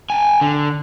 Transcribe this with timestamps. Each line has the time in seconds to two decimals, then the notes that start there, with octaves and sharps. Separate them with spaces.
0.10 G5 G#5
0.41 D3